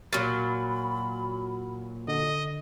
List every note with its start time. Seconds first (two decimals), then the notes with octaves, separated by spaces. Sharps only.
0.13 A#2 F#3 B5 C#6 F6 A6
2.08 D3 D#5